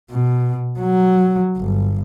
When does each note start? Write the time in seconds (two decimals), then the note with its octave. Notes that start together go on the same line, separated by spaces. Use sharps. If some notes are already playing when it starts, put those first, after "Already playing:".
0.11 B2
0.80 F#3
1.57 G1